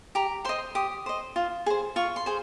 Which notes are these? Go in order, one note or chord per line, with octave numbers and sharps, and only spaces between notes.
G4 A#5
C5 D#5 C6
G4 D#6
C5 D#5
F4
G#4 C5
F4 C#6
C6
G#4 C5